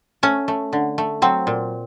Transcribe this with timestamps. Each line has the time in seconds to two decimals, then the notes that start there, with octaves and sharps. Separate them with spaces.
0.23 A3 C#4
0.48 A3
0.73 D3
0.98 A3
1.22 F#3 C4
1.47 A#2